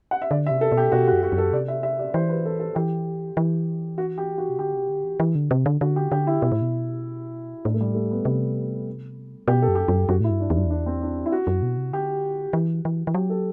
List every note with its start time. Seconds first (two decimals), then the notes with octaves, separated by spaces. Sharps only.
0.11 F#5
0.22 E5
0.31 D3 D5
0.46 E5
0.51 C3
0.61 A4
0.72 B2
0.77 G4
0.92 B2 F#4
1.08 F#4
1.12 F#2
1.23 F#4
1.32 F#2
1.38 A4
1.53 C3 D5
1.68 E5
1.83 E5
1.99 D5
2.14 E3 C5
2.29 B4
2.46 A4
2.60 A4
2.75 E3 G4
3.37 E3
3.98 F#4
4.18 G4
4.38 F#4
4.49 C3
4.58 D3 G4
4.75 C3
4.89 D3
5.04 E3
5.20 E3
5.35 D3
5.51 C3
5.66 D3
5.81 D3 F#4
5.96 G4
6.12 D3 G4
6.27 E4
6.42 B2
6.52 A2
6.62 B2
7.65 A2 D4
7.74 A3
7.81 G3
7.95 A3
8.11 B3
8.25 C3
9.48 B2 G4
9.62 A4
9.68 F#2
9.75 G4
9.88 F#2
10.09 F#2 F#4
10.20 A2 E4
10.30 G2
10.40 D4
10.50 E2
10.55 F#2 D4
10.66 E2 D4
10.86 C4
11.02 D4
11.26 E4
11.32 F#4
11.47 F#2
11.62 B2
11.77 C3
11.92 D3 G4
12.53 E3
12.85 E3
13.07 E3
13.14 F#3 G4
13.30 A4